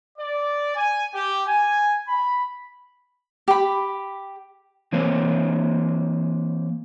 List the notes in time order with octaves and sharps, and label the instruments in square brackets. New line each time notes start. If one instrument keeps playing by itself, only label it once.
[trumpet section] D5
G#5
G4
G#5
B5
[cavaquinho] G4 B5
[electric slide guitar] E3 A#3 C4 C5 C#5